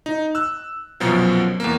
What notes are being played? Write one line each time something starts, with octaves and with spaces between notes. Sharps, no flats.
D#4
E6 F#6
C2 F#2 B2 F3 F#3
E2 A#3